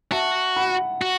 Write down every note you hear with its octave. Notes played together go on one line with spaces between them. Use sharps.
F#4 E5 A5
F#5 B5
F#4